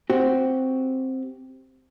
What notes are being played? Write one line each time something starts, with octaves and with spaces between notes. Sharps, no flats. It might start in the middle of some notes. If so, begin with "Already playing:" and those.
C4 F#4 G4